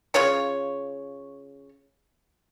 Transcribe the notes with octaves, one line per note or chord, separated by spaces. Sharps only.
C#3 F4 C#5 C#6